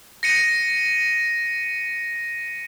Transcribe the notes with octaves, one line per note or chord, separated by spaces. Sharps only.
A#6 C#7 D#7